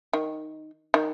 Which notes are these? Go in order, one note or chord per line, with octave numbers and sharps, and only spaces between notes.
D#3
D#3